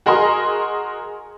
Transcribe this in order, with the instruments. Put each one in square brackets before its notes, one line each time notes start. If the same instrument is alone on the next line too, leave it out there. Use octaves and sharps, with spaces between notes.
[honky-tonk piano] F#4 G#4 A#4 D#5 C6